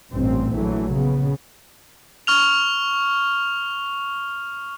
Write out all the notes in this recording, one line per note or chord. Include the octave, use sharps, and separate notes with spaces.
A1 G2 A#2 C4
A#1 E3 F#3 A3
C#3 B3
C#6 F6 F7